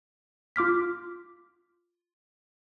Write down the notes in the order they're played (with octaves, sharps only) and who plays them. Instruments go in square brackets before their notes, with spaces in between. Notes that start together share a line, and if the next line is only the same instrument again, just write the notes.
[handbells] F4 D6 F6 B6